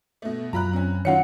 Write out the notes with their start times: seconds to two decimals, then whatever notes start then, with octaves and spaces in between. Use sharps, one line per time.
0.22 B2 A3
0.53 F#2 F#3 F4 A#5 B5 F#6
0.73 C4 C#4
1.05 D#3 F#3 C#4 F4 C#5 F#5 C#7